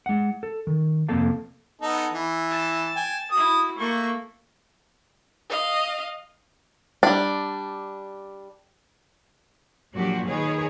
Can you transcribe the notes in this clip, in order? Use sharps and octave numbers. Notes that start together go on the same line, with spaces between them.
G#3 F#5
A4
D#3
F2 C3 A#3 A4 F5 A5
B3 D#4 A4
E3
A5
G5 G#5
E4 F#4 D#6
A3 A#3 C#6
D#5 F5
G3 D4
A#2 F3 F#3 D4 F#4 G4
D#3 G#4 B4 C#5